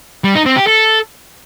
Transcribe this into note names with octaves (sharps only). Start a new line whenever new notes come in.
G3
D#4
C4
G4
A4